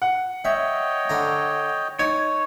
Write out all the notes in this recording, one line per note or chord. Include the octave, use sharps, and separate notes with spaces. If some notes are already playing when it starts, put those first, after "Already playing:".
F#5
C#5 D#5 E5 G5
D3 A#5
D#4 C#5